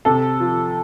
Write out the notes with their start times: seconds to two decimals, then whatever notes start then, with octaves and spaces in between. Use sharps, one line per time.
0.05 C3 A4
0.40 F3